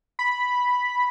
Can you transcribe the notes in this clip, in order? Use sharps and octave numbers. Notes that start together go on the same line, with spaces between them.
B5